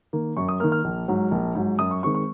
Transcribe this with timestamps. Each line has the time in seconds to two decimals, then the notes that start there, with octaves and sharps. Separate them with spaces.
0.13 D#3 A#3
0.37 F#2 C#6
0.49 D#6
0.60 A#3 F6
0.64 D#3
0.72 F6
0.84 A#1
1.08 G#2 F#3
1.31 A#1
1.55 G#2 F#3
1.78 F#2 D#6
1.91 C#6
2.03 D#3 G#3 C4 C#6
2.15 C#6